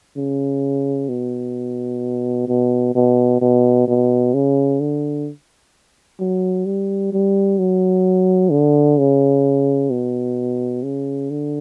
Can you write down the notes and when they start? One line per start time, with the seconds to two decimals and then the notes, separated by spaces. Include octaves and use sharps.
0.16 C#3
1.09 B2
2.48 B2
2.95 B2
3.41 B2
3.88 B2
4.34 C#3
4.80 D3
6.20 F#3
6.66 G3
7.13 G3
7.59 F#3
8.51 D3
8.98 C#3
9.90 B2
10.83 C#3
11.30 D3